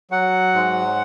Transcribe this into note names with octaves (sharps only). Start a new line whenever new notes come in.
F#3 F#5
G#2